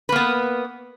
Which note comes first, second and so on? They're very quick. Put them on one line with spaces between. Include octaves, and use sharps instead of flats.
B4 A#3 B3